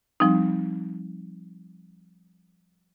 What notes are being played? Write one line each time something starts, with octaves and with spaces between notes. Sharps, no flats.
F3 G3 C4 D#4